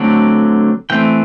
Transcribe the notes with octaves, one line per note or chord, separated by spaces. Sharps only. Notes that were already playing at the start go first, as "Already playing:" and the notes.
Already playing: D3 F#3 A3 C4
E3 A3 C4 G5